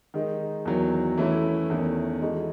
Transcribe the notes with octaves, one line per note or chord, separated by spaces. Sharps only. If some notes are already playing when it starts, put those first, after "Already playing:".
D#3 G#3 D#4
E2 D#3 F#3
E3 A3 C#4 E4
E2 D#3 A3 C#4
E3 G#3 D#4 F#4 A4